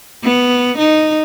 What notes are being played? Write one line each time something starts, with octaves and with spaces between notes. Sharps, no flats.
B3
D#4